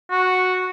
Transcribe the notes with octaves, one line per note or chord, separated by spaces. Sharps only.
F#4